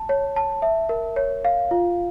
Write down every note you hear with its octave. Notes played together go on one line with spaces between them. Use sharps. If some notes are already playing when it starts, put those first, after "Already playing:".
Already playing: A5
C#5
A5
E5
A#4
C#5
F5
F4